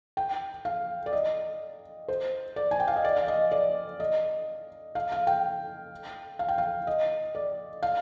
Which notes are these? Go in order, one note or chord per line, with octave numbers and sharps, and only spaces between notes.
G5
F5
D5
D#5
C5
D5
G#5
G5
F5
D#5
D5
F5
D#5
D5
D#5
F5
F5
G5
F5
G5
F5
D#5
D5
F5